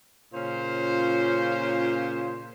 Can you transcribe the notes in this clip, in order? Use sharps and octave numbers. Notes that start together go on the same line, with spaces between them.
A#2 C#3 C#4 F4 C5